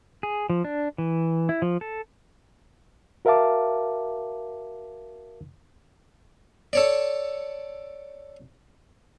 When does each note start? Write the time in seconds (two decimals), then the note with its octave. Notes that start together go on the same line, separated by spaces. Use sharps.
0.23 G#4
0.50 F3
0.65 D4
0.98 E3
1.49 E4
1.62 F3
1.81 A4
3.25 F#4 A#4 E5 F5 A5 D6
6.73 A4 C#5 D5